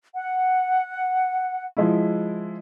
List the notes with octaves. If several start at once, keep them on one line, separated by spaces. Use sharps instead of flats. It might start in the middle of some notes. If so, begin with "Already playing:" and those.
F#5
F3 G#3 E4